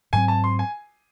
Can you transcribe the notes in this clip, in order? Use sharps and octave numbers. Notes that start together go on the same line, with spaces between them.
G#2 F#3 C4 G#5
A5
C6
G#5